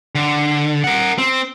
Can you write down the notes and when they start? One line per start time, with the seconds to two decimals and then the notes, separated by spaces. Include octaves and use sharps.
0.15 D3
0.84 A#4 F#5
1.18 C4